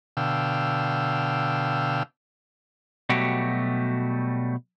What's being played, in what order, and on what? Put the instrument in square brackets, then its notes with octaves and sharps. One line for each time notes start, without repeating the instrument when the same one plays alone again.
[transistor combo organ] B2 D3 F5 G5 E6
[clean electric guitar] B2 F#3 G3 A3 F#4 G4